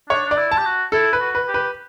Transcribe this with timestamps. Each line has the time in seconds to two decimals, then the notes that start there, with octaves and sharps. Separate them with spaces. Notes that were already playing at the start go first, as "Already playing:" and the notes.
0.09 D4 C#5
0.26 D4 D5
0.37 E4
0.51 A5
0.57 G4
0.65 F#4
0.92 E4 A4
1.13 B4
1.20 F#4
1.35 B4
1.48 G4
1.54 B4